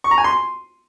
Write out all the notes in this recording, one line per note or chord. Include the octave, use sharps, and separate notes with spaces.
C#6
A#5
G#5
C6